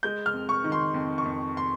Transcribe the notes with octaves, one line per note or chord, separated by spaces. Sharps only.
G#3 G6
F6
F2
C#6
D#3
C6
F2
C#6
F2
C6